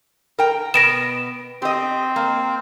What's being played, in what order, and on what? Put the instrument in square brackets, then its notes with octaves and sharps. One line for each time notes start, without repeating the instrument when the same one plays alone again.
[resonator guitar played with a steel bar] A#4 G5
[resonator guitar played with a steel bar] B2 B3 [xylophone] A#6 D7 E7
[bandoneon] C4 C5 [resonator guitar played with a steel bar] G4 D#5
[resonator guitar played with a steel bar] A#3